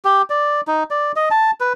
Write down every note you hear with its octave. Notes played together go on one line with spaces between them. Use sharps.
G4
D5
D#4
D5
D#5
A5
B4